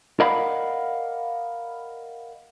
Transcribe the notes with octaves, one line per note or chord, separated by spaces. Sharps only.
A#4 D5 D#5 F5 F#5 B5